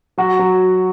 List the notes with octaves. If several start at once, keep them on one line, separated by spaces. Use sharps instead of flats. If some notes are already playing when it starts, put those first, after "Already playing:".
F#3 F#4
F#3